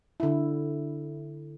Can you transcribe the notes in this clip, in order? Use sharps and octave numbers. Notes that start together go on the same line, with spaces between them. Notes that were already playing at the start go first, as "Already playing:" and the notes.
D3 E4